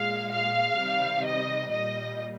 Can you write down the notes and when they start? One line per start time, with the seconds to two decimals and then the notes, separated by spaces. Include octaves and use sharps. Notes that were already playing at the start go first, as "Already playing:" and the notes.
Already playing: A#2 G#3 F5
0.31 F5
0.77 C3 D#3 G3
1.24 D#5
1.71 A#2 G3 D#5